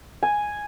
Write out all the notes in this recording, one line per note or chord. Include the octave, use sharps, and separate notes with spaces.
G#5